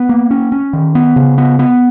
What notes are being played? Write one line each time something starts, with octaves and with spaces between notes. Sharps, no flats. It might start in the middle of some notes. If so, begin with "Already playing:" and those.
Already playing: B3
A#3
C#4
C#4
D#3
B3
C#3
B3
B3